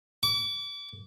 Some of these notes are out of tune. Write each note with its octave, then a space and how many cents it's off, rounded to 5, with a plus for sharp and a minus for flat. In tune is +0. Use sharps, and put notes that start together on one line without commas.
D6 -35